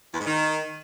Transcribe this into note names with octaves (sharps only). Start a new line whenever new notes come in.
E2
G#2
D#3